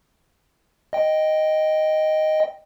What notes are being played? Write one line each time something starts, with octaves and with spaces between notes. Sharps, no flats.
D#5 G5